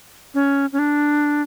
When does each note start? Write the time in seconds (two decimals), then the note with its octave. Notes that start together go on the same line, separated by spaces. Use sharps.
0.34 C#4
0.73 C#4
0.79 D4